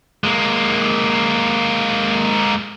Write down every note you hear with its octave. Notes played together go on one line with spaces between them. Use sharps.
G#3 A#3